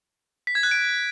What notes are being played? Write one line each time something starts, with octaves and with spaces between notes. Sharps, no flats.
B6
G#6
F#6
D7